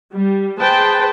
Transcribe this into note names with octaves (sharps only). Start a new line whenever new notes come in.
G3
G#4 B4 C5 G5 A5